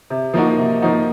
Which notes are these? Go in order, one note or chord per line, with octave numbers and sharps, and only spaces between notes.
C3
F3 A#3 D#4 F#4
C3
F3 A#3 D#4 F#4